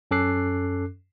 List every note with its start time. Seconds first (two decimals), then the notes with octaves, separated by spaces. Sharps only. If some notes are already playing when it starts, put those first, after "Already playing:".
0.11 F#2 C#4 A4 D6 F#6 C7